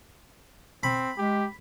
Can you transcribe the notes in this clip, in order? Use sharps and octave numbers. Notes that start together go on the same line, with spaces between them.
C4 B5
G#3 G4